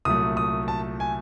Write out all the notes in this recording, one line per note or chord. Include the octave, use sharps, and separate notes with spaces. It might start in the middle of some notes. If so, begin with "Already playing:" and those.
C2 A#2 F#3 A3 D#6
D#6
A5
G#5